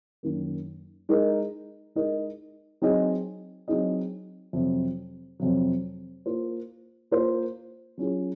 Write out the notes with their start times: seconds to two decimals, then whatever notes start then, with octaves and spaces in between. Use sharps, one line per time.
0.23 F#2 D#3 A#3
1.09 G#3 D#4 A#4 D#5
1.95 G#3 D#4 A#4 D#5
2.82 F#3 C4 D#4 G#4 D#5
3.68 F#3 C4 D#4 G#4 D#5
4.53 F2 C3 F#3
5.40 F2 C3 F#3
6.26 A#3 F4 C5
7.11 A#3 F4 C5
7.98 F#3 C#4 F4 G#4